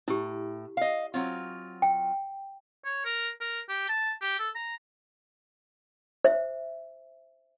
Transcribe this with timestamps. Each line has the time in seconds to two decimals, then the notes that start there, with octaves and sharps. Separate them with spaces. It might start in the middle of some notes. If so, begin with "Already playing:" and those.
0.08 A2 E4 G4
0.77 D#5 F5
1.14 F#3 C4 F4
1.82 G5
2.85 C#5
3.05 A#4
3.40 A#4
3.69 G4
3.89 A5
4.22 G4
4.39 A4
4.55 A#5
6.24 C5 E5